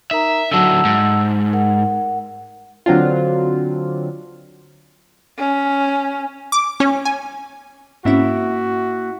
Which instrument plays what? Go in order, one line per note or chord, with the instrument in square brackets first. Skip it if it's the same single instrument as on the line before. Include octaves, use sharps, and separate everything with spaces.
[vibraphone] D#4 A#4 A#5 [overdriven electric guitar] E5
[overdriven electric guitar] D3 F#3 [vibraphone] F#5 A5 E6
[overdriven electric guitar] G#2
[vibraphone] A#4 F#5
[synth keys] D3 F#3 C4 D4 F4
[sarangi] C#4
[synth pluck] D6
C#4
G#5
[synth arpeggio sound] G#2 C4 C#4 [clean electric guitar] A#3 E4 E5 [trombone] F#4